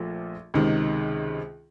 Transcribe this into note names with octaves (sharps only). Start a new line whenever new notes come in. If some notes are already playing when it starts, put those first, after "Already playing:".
Already playing: A#1 A#2 F3 A3
C#2 C3 D#3